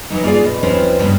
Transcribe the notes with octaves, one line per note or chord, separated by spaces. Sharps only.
E3 F#3 D#4
A#3 F4 G#4 D5 F5
B2
D#2 F3 C4 C#4 B4 C5
G2 C#3 A#3 B3